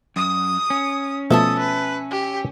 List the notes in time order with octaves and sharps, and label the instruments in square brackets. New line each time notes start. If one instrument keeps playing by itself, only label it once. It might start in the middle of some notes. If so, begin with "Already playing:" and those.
[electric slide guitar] F#2 [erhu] D#6
[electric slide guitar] C#4
[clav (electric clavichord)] B2 F3 A3 [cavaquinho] A4 E5 A5 [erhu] D#6
[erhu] B4
G4